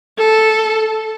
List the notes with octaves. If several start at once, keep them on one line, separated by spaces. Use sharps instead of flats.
A4